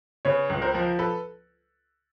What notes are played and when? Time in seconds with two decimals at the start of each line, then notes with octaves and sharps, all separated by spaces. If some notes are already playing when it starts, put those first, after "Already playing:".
0.25 C#3 B4 C#5
0.50 C#2
0.62 A#4 C5
0.74 F3
0.99 A4 B4